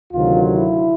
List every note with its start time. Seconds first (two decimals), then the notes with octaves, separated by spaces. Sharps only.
0.12 D2 C3 D#3 F#3 F4
0.52 E4